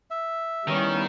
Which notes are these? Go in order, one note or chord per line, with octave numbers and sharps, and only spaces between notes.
E5
D#3 G3 B3 C#4 E4